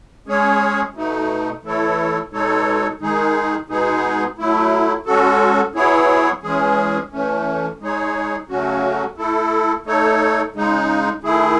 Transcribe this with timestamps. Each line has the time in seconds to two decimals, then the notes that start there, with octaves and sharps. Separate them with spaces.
0.27 G#3 C#4 G#4 C#5
0.94 B2 A3 D#4
1.63 E3 A3 E4 A4 C#5
2.31 B2 G#3 D#4 A4 C#5
3.01 D#3 G#3 D#4 G#4
3.69 B2 G#3 B3 D#4 G#4
4.38 F#3 A3 E4
5.06 G#3 C#4 F#4 A4
5.75 F#3 B3 E4 G#4 C#5
6.43 E3 G#3 C#4 G#4
7.12 E3 A3 C#4
7.80 G#3 D#4 G#4 C#5
8.49 C#3 F#3 A3 C#4 F#4
9.17 A3 E4 A4
9.86 A3 D#4 A4 C#5
10.54 C#3 G#3 D#4
11.23 D#3 A3 E4 G#4